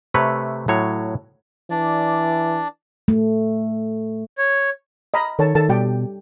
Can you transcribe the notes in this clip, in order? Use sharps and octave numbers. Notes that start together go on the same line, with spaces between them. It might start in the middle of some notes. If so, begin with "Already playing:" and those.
C3 A3 B4 C#5
A2 F#3 C#5
E3 D4 D5
A3
C#5
D#5 A#5 B5
D#3 A4 C#5 A5
D#3 A4 A5
B2 G3 G4 G5